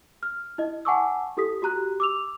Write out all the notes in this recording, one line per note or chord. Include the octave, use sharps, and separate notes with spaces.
F6
E4 D#5
F#5 G#5 A5 C#6 D6 E6
E4 G4 A4 D#6 B6
F#4 G4 A#5 F#6
D6 E6 F7